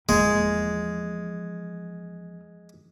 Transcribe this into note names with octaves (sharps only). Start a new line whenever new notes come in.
E2 F3 G#3 A#3